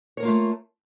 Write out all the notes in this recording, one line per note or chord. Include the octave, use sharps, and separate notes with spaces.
A3 A#3 F4 A#4 C#5